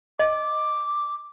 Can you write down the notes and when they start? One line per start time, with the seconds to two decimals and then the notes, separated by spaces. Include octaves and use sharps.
0.19 D#5 D6